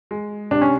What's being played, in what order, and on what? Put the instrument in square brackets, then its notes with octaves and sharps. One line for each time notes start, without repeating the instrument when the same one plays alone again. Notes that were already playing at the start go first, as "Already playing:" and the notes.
[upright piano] G#3
[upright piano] C3 [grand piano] D4
[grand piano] C#4